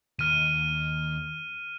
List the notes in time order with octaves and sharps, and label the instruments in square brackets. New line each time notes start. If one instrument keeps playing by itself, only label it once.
[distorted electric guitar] D#2 [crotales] F6 D#7